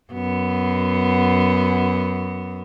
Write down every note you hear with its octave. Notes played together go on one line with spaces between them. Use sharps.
F#2 B3